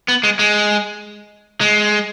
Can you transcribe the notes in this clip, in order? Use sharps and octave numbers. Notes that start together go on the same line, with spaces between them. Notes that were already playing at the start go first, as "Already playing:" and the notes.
B3
G#3
G#3
G#3